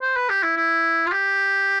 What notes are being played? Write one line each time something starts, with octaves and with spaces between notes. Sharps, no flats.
C5
B4
G4
E4
E4
F4
G4